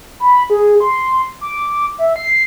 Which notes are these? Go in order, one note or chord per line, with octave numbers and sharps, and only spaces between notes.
B5
G#4
C6
D6
E5
C7